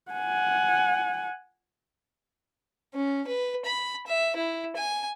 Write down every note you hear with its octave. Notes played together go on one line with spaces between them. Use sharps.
F#5 G#5
C#4
B4
B5
E5
E4
G#5